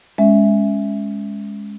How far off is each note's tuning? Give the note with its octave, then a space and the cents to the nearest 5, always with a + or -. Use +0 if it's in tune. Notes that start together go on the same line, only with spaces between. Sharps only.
G#3 -5 C#4 +0 E5 +0